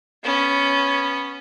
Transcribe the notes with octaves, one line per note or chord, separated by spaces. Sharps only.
B3 C#4